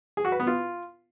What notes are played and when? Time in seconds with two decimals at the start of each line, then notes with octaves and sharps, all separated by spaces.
0.17 G#4
0.25 F#4
0.32 B4
0.40 B3
0.47 F4